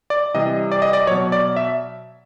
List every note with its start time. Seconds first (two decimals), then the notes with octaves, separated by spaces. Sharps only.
0.10 D5
0.34 C3 E3 G3 D#5
0.72 D5
0.82 D#5
0.93 D5
1.07 F#3 C#5
1.11 B2
1.32 D5
1.56 E5